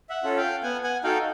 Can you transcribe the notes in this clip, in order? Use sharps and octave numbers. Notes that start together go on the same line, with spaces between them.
E5 F#5
C#4 F4 A4
F5 G5
B3 F#5 G#5
F#5 G#5
D#4 F#4 A4 F5 G5